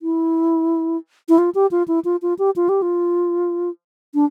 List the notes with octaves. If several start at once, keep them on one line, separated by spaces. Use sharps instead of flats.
E4
E4
F4
G4
F4
E4
F4
F4
G4
F4
G4
F4
D4